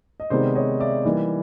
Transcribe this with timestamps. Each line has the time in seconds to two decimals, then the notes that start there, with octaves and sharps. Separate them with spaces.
0.20 D#5
0.30 C3 D#3 G#3 B3 D#4 C5 D5
0.55 C#5 D#5
0.80 D5 E5
1.05 E3 G3 A#3 D#4